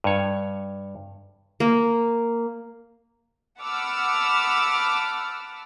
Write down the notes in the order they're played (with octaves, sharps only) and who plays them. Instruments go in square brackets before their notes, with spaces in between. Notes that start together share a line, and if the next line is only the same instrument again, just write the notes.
[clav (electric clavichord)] G2 C#5
[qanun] A#3
[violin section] F#5 A5 B5 D6 E6 F6